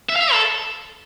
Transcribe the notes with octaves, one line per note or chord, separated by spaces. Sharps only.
E5
F5
E5
A4